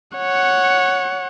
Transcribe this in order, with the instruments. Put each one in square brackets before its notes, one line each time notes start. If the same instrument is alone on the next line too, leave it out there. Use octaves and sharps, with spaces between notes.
[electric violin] C#5 F#5